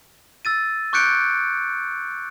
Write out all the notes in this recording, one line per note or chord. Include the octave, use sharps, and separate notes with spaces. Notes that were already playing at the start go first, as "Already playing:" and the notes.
E6 A6 D#7
C#6 D6 F#6 G6 C#7 D7